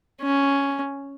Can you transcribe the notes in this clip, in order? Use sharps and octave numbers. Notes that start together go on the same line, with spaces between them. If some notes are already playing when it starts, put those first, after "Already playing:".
C#4